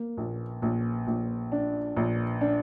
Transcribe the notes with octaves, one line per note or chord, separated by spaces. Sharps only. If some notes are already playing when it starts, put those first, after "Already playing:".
Already playing: A#3
A#1
A#1
A#1
D4
A#1
D4